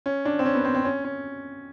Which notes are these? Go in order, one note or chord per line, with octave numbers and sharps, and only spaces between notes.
C#4
D4
C4
C#4
B3
C4
C4
C#4
C#4